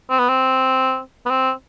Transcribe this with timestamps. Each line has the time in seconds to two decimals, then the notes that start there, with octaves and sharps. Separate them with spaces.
0.10 C4
0.19 B3
0.28 C4
1.26 B3
1.30 C4